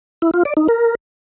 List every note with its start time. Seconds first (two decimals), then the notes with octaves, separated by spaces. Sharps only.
0.22 E4
0.34 F4
0.45 D5
0.57 D#4
0.68 A#4